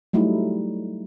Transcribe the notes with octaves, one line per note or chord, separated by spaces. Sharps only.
F#3 G3 A3 D#4 E4